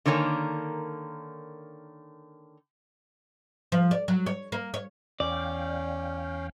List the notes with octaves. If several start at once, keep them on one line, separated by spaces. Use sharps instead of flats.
D3 D#3 A#3 C#5 G#5
F3
D5
F#3
C#5
A#3
C#5
E2 C#4 D5 F5 G5